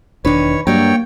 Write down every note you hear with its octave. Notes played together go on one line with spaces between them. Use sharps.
E1 D#3 D4 B4 C#5
G2 F#3 A#3 A#4 C#5 D5 G5